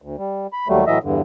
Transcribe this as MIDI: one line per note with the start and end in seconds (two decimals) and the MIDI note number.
0.02 0.16 38
0.18 0.47 55
0.53 0.68 83
0.68 0.85 39
0.68 0.85 54
0.68 0.85 55
0.68 0.85 57
0.87 0.98 45
0.87 0.98 52
0.87 0.98 54
0.87 0.98 75
0.87 0.98 76
1.03 1.21 40
1.03 1.21 43
1.03 1.21 50